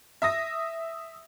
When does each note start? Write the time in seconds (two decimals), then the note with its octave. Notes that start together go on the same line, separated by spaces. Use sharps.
0.22 E5 D#6 A#6